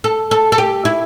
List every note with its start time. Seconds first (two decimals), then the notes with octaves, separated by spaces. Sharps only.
0.04 A4
0.31 A4
0.52 A4
0.58 G4
0.85 E4